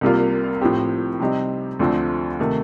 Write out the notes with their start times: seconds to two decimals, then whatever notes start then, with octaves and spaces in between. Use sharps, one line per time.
0.01 C2 C3 G3 A#3 F4
0.61 A2 F3 C4 G4
1.20 C3 G3 C4 D#4 G4
1.79 D2 D3 F3 A3 C4
2.40 C3 D#3 A3